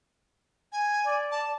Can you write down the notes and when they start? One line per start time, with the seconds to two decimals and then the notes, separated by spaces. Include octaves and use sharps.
0.72 G#5
1.05 D5
1.31 A5